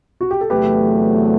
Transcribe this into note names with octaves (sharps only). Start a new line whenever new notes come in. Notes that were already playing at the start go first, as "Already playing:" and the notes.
F#4
G4
A4
E2 C3 F#3 A3 G4 B4